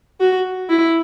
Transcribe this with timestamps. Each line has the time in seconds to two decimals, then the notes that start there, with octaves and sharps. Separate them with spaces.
0.21 F#4
0.70 E4